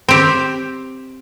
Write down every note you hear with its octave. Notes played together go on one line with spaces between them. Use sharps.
C4 G4